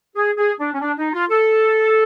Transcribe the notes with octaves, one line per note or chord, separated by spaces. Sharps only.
G#4
G#4
D4
C#4
D4
D#4
F4
A4